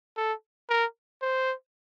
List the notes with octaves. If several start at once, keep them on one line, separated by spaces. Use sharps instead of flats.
A4
A#4
C5